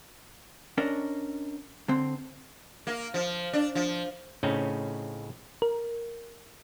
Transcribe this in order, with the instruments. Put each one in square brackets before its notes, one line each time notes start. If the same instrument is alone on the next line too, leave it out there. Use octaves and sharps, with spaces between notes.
[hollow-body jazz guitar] C#4 D4 A#4 D#5
D3 C4
[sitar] A#3
F3
D4
F3
[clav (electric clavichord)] A2 C#3 C4 C#4 D#4
[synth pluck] A#4